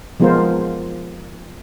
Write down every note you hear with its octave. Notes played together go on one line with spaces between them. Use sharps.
F3 G#3 B3 F4 A#4 C5